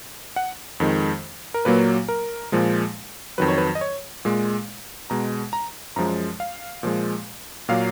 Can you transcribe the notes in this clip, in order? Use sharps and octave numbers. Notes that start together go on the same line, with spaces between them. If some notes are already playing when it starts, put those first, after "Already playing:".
F#5
F2 D#3 G#3
A#4
A#2 F#3 A#3 B4
A#4
A#2 F3 G#3
F2 D#3 F#3 B4
C#5
B4
D#5
C#5
A#2 G#3
B2 G#3 A#5
A#5
F#2 F3 G#3 A#5
F5
A#2 F3 G#3
A#2 F#3 A#3 F5